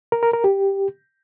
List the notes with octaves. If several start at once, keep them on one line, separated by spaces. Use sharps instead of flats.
A#4
A#4
A#4
G4